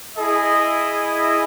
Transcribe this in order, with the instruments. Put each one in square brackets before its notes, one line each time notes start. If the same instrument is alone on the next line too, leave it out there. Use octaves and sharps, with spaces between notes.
[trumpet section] E4 G#4 D#5